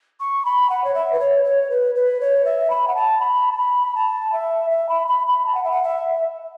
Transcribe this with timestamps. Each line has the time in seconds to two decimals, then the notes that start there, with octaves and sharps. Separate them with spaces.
0.19 C#6
0.45 B5
0.69 F#5
0.84 C#5
0.94 E5
1.12 B4
1.19 C#5
1.44 C#5
1.69 B4
1.94 B4
2.20 C#5
2.44 E5
2.69 B5
2.87 F#5
2.95 A5
3.19 B5
3.51 A5
3.57 B5
3.95 A5
4.32 E5
4.70 E5
4.88 B5
5.07 B5
5.26 B5
5.45 A5
5.54 F#5
5.63 E5
5.71 F#5
5.83 E5